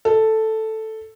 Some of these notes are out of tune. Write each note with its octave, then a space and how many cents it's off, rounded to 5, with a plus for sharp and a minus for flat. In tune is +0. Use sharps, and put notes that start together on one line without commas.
A4 +0